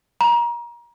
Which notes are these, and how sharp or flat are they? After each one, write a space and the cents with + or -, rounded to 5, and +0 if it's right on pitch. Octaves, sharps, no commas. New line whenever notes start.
A#5 +30